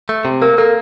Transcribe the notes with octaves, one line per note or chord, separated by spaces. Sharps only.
A3
C3
A#3 A#4
A#3 A4